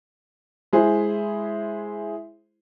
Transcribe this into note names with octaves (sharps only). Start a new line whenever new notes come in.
G#3 E4 G#4 C5